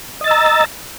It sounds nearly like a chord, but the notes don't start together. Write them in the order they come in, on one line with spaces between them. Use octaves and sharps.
D#5 A6 E6 A#5